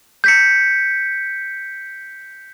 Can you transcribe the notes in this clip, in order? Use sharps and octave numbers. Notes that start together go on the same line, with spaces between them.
G6 B6 C#7